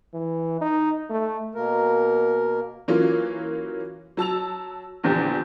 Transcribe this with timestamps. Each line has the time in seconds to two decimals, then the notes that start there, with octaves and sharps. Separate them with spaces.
0.14 E3
0.61 D#4
1.10 A3
1.55 B2 A#3 A#4
2.88 E3 F#3 A#3 C#4 F4
4.17 F#3 A5 E6 F7
5.03 A#1 E2 D3 G4